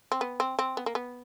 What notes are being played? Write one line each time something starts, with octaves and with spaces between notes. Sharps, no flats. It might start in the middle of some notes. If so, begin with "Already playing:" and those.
C4
B3
C4
C4
B3
A#3
B3